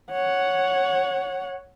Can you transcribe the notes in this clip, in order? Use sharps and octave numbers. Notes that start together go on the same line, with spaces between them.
C#5 F#5